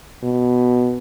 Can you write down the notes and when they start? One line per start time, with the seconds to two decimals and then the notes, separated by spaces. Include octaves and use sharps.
0.23 B2